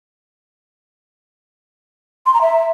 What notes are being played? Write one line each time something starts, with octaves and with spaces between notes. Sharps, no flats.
C6
A#5
E5